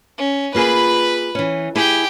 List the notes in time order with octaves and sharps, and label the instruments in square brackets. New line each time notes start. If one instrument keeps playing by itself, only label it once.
[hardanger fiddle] C#4
[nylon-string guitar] A#3 F4 G#4 [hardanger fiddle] B4 B5
[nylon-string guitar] E3 C#4
[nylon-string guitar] E4 G#4 G#5 [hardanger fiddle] G4 G5